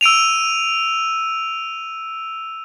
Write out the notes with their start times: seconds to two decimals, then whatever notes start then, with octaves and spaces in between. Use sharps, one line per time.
0.01 E6 D7 D#7 F7